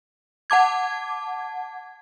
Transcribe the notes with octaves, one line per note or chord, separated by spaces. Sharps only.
F#5 A5 D6 G#6